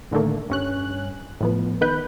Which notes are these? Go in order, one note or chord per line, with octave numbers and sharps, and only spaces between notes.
A2 D3 D#3 A3 A#3
G2 C#4 F#6
A2 F3 B3
D#3 B3 D#4 B4 F#6 G6